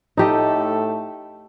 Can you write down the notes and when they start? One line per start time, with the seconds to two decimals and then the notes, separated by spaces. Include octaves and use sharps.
0.17 A2 A3 D#4 G4 A4 D#5